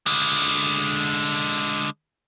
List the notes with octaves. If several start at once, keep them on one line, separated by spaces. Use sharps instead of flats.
D3 G#3